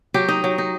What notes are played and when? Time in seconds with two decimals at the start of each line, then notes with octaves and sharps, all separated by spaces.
0.14 F#3 G4
0.28 D#4
0.44 F#3
0.58 D#4